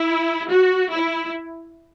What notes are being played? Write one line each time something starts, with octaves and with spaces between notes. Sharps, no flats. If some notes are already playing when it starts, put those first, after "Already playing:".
Already playing: E4
F#4
E4